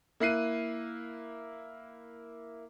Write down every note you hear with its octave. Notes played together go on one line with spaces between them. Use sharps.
A#3 E4 F#6 C7 D#7